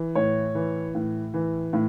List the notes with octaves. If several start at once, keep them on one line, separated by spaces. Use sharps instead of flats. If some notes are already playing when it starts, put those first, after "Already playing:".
Already playing: E3
A2 C#5
E3
A2
E3
A2